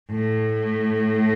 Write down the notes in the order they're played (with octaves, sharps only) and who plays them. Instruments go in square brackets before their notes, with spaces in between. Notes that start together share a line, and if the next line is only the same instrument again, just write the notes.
[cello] A2